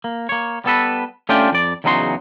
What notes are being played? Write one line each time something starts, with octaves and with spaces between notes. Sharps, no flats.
A#3
A#3 C#5
G3 B3 A4 B4
A3 C#4 D4 F4 G4 G5
F2 D5
E2 C#3 F#3 D#4 F#4 C6